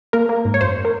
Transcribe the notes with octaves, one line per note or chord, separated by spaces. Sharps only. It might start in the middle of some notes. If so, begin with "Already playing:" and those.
A#3 A#4
A#3
G#2
C#5
F#2 C5
A#4